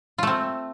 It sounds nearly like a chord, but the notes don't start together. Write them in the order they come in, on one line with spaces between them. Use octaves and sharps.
F4 A3 C4